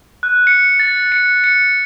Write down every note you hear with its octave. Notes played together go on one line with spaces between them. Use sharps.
F#6
C#7
A6
C#7
C#7